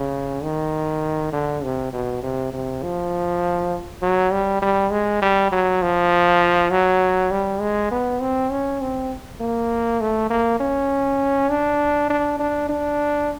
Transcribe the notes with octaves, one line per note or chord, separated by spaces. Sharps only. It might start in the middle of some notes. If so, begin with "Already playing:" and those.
Already playing: C#3
D#3
D3
C3
B2
C3
C3
F3
F#3
G3
G3
G#3
G3
F#3
F3
F#3
G3
G#3
B3
C4
C#4
C4
A#3
A3
A#3
C#4
D4
D4
D4
D4